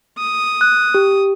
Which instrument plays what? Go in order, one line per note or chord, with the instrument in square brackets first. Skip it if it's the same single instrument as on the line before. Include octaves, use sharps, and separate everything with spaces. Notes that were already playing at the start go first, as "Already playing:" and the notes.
[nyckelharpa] D#6
[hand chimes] F#6
G4